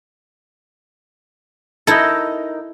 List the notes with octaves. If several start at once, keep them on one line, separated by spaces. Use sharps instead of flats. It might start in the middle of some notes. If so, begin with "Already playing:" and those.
D#4 E4 A4 A#4 D#5